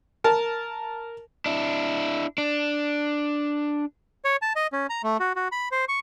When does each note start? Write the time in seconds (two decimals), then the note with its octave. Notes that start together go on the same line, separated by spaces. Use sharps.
0.24 A#4 A5
1.46 D4 E4
2.38 D4
4.25 C#5
4.42 A5
4.56 D#5
4.72 C#4
4.90 A#5
5.03 A3
5.20 F#4
5.36 F#4
5.52 B5
5.71 C5
5.88 C#6